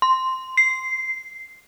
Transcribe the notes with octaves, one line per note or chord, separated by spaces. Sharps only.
C6
C7